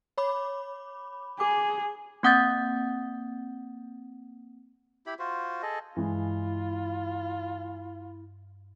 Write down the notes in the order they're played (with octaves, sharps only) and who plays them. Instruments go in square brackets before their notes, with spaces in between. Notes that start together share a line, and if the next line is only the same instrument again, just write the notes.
[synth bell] C#5 B5 D6
[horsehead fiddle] G#4 [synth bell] D6
[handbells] A#3 C4 F#5 D#6 G6 A6
[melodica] E4 G4 B5
F4 F#4 C5
G#4 A4 D#5
[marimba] G2 [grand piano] E3 G#3 [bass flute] E4 [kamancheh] F4